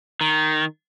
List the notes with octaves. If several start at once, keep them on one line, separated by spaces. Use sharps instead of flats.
D#3